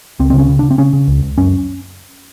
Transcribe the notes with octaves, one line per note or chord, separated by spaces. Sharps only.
C#2 C4
C4
C#3 C#4
C#3
C#3 D4
C4
C#3 C#4
C#3
C#2
C#2
F#2 C#4